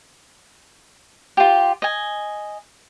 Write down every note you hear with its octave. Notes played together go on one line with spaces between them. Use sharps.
F4 G4
D#5 G#5